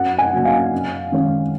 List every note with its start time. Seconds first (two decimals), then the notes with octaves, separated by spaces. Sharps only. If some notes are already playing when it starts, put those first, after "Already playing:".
Already playing: F#2 F#5
0.18 G#5
0.33 C#3 F#3 A#3 C#4
0.45 F5
0.72 F#2
1.12 D#3 G#3 C#4